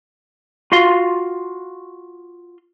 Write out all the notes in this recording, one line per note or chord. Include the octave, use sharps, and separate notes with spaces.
F4 F#4 F5 C6